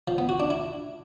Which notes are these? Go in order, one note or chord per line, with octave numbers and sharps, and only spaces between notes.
F3
B3
F#4
D4
E4